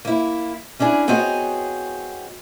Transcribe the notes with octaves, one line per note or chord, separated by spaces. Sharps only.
A#3 E4
C#4 D4 E4 G#4
B3 C4 F#4 G#4 C#5 D#5